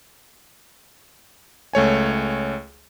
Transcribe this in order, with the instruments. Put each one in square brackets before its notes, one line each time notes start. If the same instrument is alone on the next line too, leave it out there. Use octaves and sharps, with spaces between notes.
[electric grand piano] C#2 A3 C#5 G#5